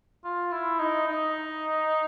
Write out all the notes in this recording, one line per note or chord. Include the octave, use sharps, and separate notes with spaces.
F4
E4
D#4
D#4